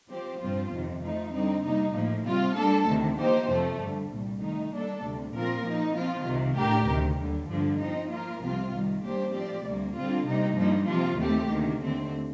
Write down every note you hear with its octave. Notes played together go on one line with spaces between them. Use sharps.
F3 C4 G4 C5
G2 F3 C4 F4 C5
F2 C3 D#3
F3 A3 D#4
D3 G3 C4 D#4
C3 G3 A#3 D#4
A2 F3 A#3
C3 G3 C4 F4
G3 A#3 D4 A4
D2 C3 D#3
F3 A#3 D#4 G4 C5
F2 C3 F3 A3
G2 D3 G3
C2 A#2 G3
D#3 A3 D#4
G3 A#3 D4 A4
D2 C3 G3
A#2 F3 C4 F4 A#4
F3 A#3 D#4
F3 C4 F4
C2 C3 D#3
A2 A3 D4 G4 A#4
D2 C3 D#3
D#2 D3 G3
G2 D3 F3 A#3
F3 C4 D#4
F3 A#3 F4 A#4
C2 C3 F3 C4 F4
C2 C3 D#3 G3
G3 A#3 D4 G4 C5
A2 F3 C4 G4 D5
D2 C3 G3 A#3
D3 G3 C4 F4
C3 G3 A#3 D#4
G2 F3 A#3 D#4
C3 F3 A#3 F4
D#2 D#3 A3 C4 G4
D2 C3 D#3 A#3
D#2 D3 A3 C4